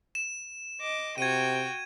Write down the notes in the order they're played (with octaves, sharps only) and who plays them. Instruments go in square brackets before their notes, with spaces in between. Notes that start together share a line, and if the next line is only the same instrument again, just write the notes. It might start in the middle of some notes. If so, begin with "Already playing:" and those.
[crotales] E7
[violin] D#5 D6
[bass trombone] C3 [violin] F#4 G5 [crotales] G#6 D#7